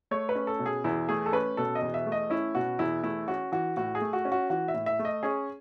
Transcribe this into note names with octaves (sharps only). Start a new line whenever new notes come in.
A3 C#5
B4
C#4
A4
B2
G#4
E2 E4
A3 G#4
A4
C#4 B4
B2 A4
D#5
E2
E5
A3
D#5
C#4 E4
B2 F#4
E2 E4
A3 E4
C#4 F#4
E3 F#4
A2 F#4
G#4
A3
F#4
C#4
F#4
E3 F#4
E5
A2
E5
A3
D#5
C#4 G#4